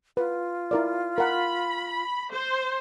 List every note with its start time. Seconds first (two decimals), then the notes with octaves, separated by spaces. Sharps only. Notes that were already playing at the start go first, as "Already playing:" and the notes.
0.17 F4 B4
0.71 E4 A#4 D5
1.18 A#4 F#5 B5
2.31 C5